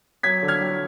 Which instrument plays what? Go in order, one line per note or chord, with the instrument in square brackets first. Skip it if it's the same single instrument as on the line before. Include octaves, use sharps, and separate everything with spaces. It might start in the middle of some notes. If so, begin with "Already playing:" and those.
[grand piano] F#3 G#6 B6
D3
F6 G#6
F#3